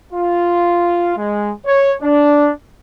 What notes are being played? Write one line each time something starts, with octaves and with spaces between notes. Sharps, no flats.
F4
G#3
C#5
D4